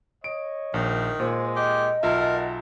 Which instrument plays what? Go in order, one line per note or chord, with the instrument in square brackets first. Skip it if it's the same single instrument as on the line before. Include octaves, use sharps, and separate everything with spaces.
[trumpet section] C#5 D#5 [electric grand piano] D7
[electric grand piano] A#1 [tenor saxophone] D#3
[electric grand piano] A#2 [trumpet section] G#3 [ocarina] C5
[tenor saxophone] G4 [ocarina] D#5
[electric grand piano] B1 F4 E5 [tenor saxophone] A#4 [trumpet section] F#5 A5 A#5